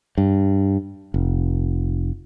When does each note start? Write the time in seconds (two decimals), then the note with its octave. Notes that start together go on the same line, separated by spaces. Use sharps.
0.18 G2
1.14 F1